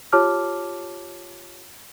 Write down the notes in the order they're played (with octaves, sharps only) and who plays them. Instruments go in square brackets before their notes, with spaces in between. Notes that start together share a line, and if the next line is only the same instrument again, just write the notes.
[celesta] F4 G4 C#5 A5 D6 F6